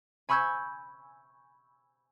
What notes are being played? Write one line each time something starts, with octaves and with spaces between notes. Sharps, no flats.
G#5 B5 C#6 E6 G6 G#6